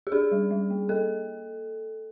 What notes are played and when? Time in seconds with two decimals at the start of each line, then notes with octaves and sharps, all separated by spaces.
0.07 G4
0.12 D4 G#4
0.32 G3
0.51 G3
0.70 A#3
0.89 A#3 A4